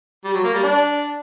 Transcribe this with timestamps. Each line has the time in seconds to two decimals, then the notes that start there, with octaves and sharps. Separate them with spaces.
0.24 G3
0.34 F#3
0.44 A#3
0.53 G3
0.63 D4